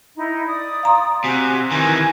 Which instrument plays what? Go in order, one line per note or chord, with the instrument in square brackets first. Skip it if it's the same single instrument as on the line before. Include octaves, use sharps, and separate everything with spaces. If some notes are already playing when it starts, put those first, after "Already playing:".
[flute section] D#4 E4
D5 D#6
[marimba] F5 A#5 C6
[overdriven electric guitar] C3 [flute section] F#4 G#5
[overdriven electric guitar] D#3 E3 [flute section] G#5